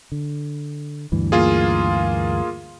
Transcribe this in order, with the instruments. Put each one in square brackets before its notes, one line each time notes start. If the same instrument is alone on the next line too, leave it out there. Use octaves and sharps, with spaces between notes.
[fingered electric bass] D3
D2 G2 E3
[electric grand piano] A#3 F4 G#4